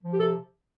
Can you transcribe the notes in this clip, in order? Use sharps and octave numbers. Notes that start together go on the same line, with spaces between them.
F3
G4
C3 A4